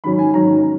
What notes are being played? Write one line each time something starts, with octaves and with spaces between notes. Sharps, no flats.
G#2 D#3 F#3 C#4 B5
G#5
G#2 D#3 F#3 C#4 A#5